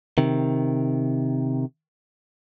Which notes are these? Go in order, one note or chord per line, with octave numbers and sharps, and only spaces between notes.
C3 D#3